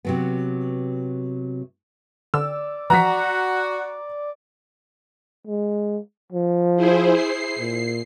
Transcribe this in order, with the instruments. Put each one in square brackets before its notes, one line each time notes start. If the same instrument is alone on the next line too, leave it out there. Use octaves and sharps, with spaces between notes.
[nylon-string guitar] C3 F#3 B3
[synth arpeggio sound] D3 [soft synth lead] D5 [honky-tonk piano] E6
[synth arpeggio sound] E3 F3 [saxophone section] F#4 [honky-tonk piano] A#5 B6
[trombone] G#3
F3
[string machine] E4 G#4 C5
C7
[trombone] A#2